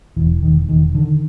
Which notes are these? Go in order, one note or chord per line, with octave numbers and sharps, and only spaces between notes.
E1 E3
E1 D#3
E1 D#3
D3 D#3